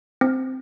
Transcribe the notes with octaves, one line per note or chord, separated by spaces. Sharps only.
C4